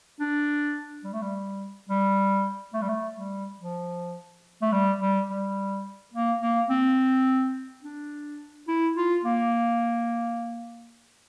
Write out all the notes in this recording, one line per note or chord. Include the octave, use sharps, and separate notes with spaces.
D4
G3
A3
G3
G3
A3
G3
A3
G3
F3
A3
G3
G3
G3
A#3
A#3
C4
D4
E4
F4
A#3